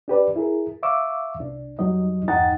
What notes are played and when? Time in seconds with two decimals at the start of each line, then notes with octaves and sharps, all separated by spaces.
0.08 D4 G4 B4 D5
0.36 E4 G#4 A#4
0.83 E5 F5 C#6 D6 E6
1.39 C2 D4
1.79 F2 F#3 G3 D#4 D#5
2.28 E2 G2 D#4 F#5 G5 A6